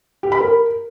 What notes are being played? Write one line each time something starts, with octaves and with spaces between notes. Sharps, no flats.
G4
B5
A#4